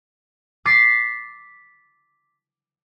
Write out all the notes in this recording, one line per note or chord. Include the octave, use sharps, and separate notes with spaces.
D6 A6 B6 C7 D7